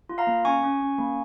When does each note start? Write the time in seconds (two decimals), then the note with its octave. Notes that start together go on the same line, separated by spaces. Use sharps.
0.09 F4
0.18 F5 A#5
0.27 A#3
0.45 C#4 G#5 C#6
0.63 C#4
0.81 C#4
0.98 A#3